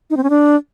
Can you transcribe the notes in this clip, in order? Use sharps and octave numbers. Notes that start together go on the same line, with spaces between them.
D#4
C4
C#4
D4